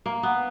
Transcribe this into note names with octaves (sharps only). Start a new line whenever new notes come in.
A#3
B3